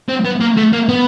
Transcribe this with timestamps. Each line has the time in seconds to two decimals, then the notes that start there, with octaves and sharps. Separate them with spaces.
0.09 C4
0.25 B3
0.41 A#3
0.57 A3
0.73 A#3
0.89 B3